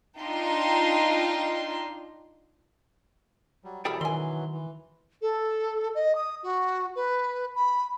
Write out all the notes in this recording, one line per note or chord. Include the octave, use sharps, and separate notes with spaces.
D4 D#4 F4 G5 C6
F#3 G3
B2 E3 F#3 G3 G#4 A4 G5 B5
D3 D#3 G#5 C6
E3
A4
D#5
D#6
F#4
B4
B5